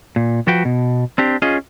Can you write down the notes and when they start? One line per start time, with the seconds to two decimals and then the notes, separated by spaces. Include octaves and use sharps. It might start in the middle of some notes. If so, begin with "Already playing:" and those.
0.16 A#2
0.47 F3 F#4 B4 G5
0.65 B2
1.18 C4 D4 G4
1.42 C#4 F4 G#4 D#5